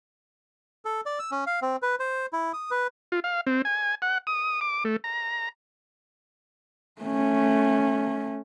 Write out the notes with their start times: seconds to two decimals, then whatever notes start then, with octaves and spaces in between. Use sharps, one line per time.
0.85 A4
1.06 D5
1.19 E6
1.31 C#4
1.47 F5
1.62 C4
1.82 B4
2.00 C5
2.33 E4
2.54 D#6
2.71 B4
3.12 F4
3.24 F5
3.47 C4
3.65 G#5
4.02 F#5
4.27 D#6
4.61 D6
4.85 A3
5.04 A#5
7.02 A3 C#4